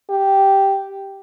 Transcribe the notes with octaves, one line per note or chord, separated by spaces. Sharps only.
G4